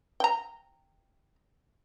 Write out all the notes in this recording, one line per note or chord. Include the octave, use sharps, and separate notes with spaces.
G5 A#5